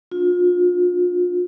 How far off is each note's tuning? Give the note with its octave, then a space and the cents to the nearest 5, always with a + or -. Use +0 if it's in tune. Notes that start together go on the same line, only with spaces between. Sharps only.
D4 -5 F4 +35